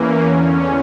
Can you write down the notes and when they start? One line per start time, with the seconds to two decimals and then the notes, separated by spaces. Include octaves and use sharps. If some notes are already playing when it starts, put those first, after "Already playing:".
Already playing: E2 E3 A#3 C#4
0.24 E2 D3 C#4